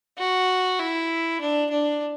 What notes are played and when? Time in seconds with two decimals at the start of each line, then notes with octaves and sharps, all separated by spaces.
0.18 F#4
0.79 E4
1.41 D4
1.70 D4